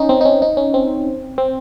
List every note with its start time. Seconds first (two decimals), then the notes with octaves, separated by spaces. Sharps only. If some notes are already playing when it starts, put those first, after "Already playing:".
Already playing: C#4 D#4
0.09 C4
0.21 D#4
0.25 C#4
0.42 D#4
0.57 C#4
0.74 C4
1.38 C4